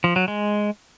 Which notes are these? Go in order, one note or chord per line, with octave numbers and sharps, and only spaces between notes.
F3
F#3
G#3